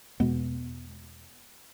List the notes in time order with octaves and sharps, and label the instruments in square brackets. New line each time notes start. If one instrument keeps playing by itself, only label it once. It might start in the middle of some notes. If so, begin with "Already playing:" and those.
[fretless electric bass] E2 B2 G#3 B3